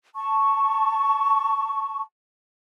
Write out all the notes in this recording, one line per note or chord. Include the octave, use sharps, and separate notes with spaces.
A5 C#6